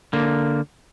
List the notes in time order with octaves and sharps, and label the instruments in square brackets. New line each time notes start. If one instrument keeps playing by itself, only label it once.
[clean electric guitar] D3 A#3